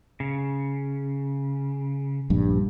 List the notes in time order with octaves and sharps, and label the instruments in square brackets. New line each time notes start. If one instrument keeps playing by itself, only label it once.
[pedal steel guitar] C#3
[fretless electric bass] A#1 G2